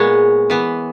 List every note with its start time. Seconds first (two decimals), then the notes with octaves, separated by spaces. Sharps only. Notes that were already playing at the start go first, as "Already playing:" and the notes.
Already playing: A#2 G#3 B3 C#5
0.50 E3 B3